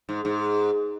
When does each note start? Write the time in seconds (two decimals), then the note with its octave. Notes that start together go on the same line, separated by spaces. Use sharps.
0.09 G#2
0.25 G#2